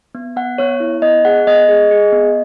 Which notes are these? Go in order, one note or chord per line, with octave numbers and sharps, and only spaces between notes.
B3
B3 F#5
B3 C#5
E4
B3 D#5
G#4 F#5
B3 D#5
G#4
G#4
B3